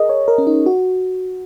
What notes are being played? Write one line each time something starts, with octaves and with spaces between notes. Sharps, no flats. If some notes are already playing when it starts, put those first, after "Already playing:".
Already playing: G#4 A#4 D#5
C#5
A#4
C#4
D#4
F#4